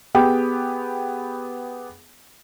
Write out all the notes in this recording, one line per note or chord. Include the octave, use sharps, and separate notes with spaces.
B3 G4 G#4 G5